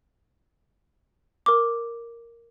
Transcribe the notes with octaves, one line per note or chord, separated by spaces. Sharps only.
A#4 D6